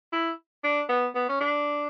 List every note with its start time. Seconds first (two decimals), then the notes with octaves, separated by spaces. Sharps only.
0.13 E4
0.64 D4
0.89 B3
1.15 B3
1.29 C#4
1.40 D4